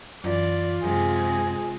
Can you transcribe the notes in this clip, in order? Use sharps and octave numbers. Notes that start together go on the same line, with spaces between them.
F#2 E3 F4 D5
F#2 C3 G#3 G#4